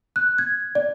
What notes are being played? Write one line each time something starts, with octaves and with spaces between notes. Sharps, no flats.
F#6
G#6
D5